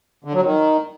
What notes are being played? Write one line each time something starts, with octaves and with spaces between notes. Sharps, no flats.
D3
F#3
D#3